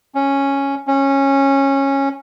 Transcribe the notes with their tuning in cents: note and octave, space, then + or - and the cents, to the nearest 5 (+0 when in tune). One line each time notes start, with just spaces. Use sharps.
C#4 -5
C#4 -15